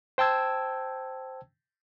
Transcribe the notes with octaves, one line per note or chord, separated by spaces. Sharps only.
C5 G5 A5 E6 G#6